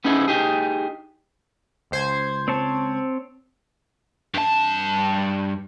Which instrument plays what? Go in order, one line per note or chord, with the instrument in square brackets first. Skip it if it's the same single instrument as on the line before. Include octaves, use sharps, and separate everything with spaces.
[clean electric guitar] B3 C#4 D#4 E4 G#4
D#4 G4 G#4
[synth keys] C#2 C5 G#6
[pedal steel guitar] C4 C#5 A5
[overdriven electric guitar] G2 A5